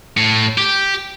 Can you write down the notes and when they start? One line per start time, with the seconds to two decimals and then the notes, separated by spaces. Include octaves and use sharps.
0.17 A2
0.58 G4